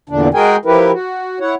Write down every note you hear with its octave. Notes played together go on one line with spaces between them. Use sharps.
E2 A#2 D3 D4
G#3 F#4 G#4 A#4 G5 G#5
F3 E4 G4 A#4 B4
F#4
E4 C#5 F#5